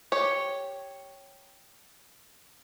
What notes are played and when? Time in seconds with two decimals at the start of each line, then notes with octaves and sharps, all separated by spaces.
0.12 G4 C#5